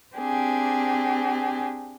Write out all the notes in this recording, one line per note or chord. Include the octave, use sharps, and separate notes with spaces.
C4 D4 G4 G#4